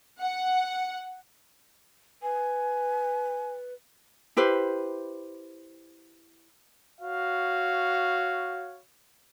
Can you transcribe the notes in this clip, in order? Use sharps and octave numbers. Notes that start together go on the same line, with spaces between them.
F#5
B4 G#5
E4 G4 B4 C5
F#4 C#5 F5